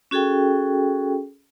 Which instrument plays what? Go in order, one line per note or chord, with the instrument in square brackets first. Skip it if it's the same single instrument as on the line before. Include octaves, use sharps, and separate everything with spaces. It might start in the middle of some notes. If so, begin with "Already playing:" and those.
[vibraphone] C#4 F#4 G#4 A4 G5